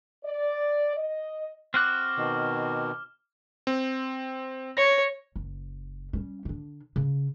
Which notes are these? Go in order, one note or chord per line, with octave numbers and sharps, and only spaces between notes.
D5
D#5
C4 F#4 D6 F6 F#6
B2 D#3
C4
C#5 A#6
F#1
G3 C#4
D3 D4
C#3